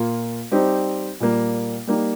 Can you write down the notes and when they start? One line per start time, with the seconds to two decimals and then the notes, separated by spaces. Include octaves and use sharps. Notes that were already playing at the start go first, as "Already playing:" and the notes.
Already playing: A#2 A#3 F4
0.51 G3 C4 D#4 G4
1.20 A#2 G3 A#3
1.87 G3 A#3 D#4 G4